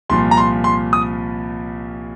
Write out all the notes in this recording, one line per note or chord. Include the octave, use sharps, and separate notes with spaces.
C2 A#2 F3 C6
A#5
C6
C6
D#6